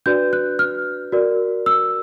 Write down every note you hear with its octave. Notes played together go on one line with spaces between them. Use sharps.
D4 F#4 B4 D5 G6
F#6
F6
F#4 A#4 D5
E6